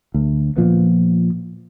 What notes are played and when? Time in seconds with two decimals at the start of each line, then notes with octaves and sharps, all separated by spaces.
0.14 D2
0.57 A#2 F3 B3